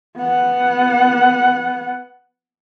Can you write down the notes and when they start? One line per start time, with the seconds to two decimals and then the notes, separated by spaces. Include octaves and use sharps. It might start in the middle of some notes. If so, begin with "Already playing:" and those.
0.18 B3 F#5